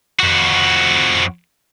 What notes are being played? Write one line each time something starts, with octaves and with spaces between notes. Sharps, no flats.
F2 F#4